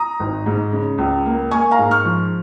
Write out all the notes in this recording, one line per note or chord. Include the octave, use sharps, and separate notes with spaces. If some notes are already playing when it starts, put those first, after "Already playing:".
Already playing: A#5 D#6
G#1
G#2
C#3
C#2
A#3
A#3 G#5 C#6
F5 A#5
G#2
C#6 F6
F3